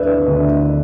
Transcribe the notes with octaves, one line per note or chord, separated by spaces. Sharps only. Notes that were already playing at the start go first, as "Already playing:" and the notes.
Already playing: D2 D3 B4 D5 E5
D2